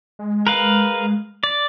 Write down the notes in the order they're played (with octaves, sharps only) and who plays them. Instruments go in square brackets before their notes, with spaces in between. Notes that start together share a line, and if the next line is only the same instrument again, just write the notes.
[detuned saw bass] G#3
[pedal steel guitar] A#4 B4 F5
D5